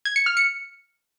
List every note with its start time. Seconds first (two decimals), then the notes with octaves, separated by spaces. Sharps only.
0.05 G#6
0.16 C#7
0.26 F6
0.37 C#7